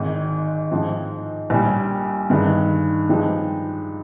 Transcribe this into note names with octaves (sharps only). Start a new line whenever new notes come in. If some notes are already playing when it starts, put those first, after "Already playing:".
Already playing: G#1 G#2 D#3
G#2 F3 C4
A#1 A#2 G3
G2 D#3 G#3 D#4
G2 F3 G#3 D#4 G4